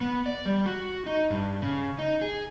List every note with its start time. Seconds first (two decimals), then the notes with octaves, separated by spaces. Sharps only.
0.01 B3
0.26 D5
0.46 G3
0.66 F#4
1.06 D#4
1.30 G2
1.62 C#3
1.99 D#4
2.21 G#4